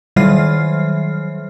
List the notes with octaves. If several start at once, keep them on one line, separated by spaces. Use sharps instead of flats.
D#3 F#3 G3 E5 F6 C7